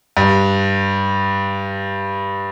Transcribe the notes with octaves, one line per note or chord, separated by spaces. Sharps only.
G2